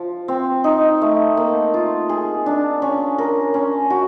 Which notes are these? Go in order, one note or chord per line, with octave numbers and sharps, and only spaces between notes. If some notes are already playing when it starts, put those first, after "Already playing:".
Already playing: F3
C4
D#4
A3
A#3
F4
G#4
D4
C#4
A#4
C#4
F#4